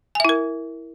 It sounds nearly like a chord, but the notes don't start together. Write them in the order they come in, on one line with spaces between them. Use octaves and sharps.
G#5 E5 E4 A#4